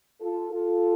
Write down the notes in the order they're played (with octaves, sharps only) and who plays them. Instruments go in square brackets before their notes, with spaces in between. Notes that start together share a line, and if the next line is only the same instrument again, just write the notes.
[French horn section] F4 A4
F4 A4